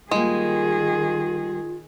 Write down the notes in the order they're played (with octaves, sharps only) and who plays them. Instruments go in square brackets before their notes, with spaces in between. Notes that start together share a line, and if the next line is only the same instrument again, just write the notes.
[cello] D#3 G#4 [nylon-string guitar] G3 A#3 [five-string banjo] G#3 [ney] F4